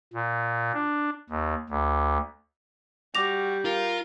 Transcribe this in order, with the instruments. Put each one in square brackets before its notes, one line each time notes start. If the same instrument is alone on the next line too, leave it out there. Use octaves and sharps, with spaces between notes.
[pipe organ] A#2
D4
D#2
D2
[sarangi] G3 [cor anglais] F#4 [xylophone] D6 A#6 F7
[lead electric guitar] F4 [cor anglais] A#4